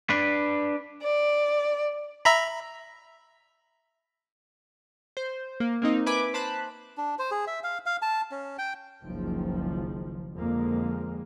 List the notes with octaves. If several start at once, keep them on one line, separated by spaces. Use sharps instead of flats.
D4 B4
D5
E5 A#5 B5
C5
A#3
A#3 C4 D#4
B4 E5 G#5 B5 D6
C5 A5 B5 F#6
D4
C5
G#4
E5
F5
F5
A5
C#4
G5
F#1 C#2 D#3 F3
F2 D3 G#3 A#3